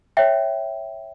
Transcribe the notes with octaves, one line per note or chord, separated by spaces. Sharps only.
C#5 E5 G5